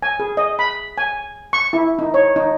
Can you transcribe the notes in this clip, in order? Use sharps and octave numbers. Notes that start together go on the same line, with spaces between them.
G#5
G#4
D#5
B5
G#5
C#6
E4
D#4
C#5
D#4